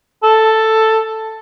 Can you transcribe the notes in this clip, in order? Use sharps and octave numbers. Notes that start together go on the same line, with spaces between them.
A4